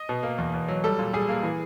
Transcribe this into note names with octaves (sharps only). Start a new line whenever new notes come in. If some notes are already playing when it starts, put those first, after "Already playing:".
Already playing: D#5
B2
A#3
E2
E2
F#3
G3 A4
A#2
G3 G#4
A#3
E3